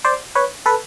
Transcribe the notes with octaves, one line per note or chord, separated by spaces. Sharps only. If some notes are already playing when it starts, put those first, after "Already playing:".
C5 D5
B4 C#5
A4 B4